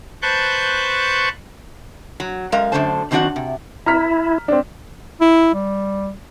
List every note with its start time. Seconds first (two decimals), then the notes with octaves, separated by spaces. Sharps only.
0.22 B4 C5 A5 C#6 F#6 G6
2.20 F#3
2.52 F#2 G#3 A#4 F5
2.72 F#2 D3 E3 A3 C5 A5
3.11 F#2 D#3 C4 D4 F#4 F#5
3.36 C3
3.86 E4 A#5 F6 B6
4.48 C4 D4
5.21 E4
5.54 G3